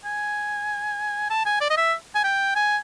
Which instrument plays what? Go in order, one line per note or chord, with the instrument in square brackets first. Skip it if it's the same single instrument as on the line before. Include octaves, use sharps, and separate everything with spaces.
[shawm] G#5
A5
G#5
D5
D#5
E5
G#5
G5
G#5